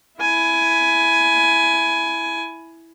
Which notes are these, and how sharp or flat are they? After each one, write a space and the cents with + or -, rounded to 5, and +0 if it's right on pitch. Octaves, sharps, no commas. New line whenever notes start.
E4 +0 G#5 +15